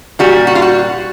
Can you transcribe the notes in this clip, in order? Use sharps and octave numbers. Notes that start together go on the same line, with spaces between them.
A#2 G3 F#4
F#4
F4
F#4